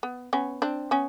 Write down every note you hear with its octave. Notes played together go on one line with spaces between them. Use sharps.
B3
B3 C#4
C4 D4
B3 C#4